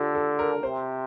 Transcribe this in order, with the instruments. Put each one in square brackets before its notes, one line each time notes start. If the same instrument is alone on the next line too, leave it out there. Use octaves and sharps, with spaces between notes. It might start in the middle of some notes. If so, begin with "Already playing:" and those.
Already playing: [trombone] D3 [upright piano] F4 G4 A4
[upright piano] A4
A#4
[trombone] C3 [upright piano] C5